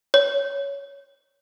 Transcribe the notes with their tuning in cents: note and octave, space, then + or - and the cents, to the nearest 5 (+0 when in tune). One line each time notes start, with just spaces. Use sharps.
C#5 +10